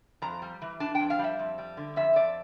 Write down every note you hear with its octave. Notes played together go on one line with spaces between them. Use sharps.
F2 A#5
G3
E3
D4 A5
G5
F2
F5
G3 E5
F2
G3
D3
F2 E5
F2 D5